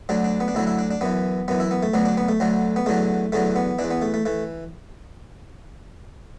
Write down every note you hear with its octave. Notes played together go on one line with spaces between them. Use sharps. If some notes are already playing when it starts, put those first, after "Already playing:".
D2 D3 F#3 D4
D4
B3
D4
D2 D3 F#3 E4
E4
D4
D4
F#2 E3 B3
F#2 E3 B3
E4
B3
A3
D2 D3 F#3 B3
D4
B3
A3
D2 D3 F#3
B3
E2 D3 F#3 A3
E2 D3 F#3 A3
B3
E3 D4
E2
B3
A3
A3
E3 A3